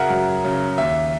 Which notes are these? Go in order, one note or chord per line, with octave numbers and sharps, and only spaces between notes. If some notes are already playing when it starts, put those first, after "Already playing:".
Already playing: F#2 C#3 F#3 G#4 A#4 E5 F#5
F#2
C#3 F#3
D#2 E5